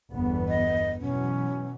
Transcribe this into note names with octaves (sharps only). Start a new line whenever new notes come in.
G1 E2 B3
D#5
B2 E3 F#3 C#4